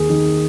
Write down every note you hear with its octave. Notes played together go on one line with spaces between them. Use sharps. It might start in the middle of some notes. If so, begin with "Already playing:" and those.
Already playing: D#2 G#4
D#3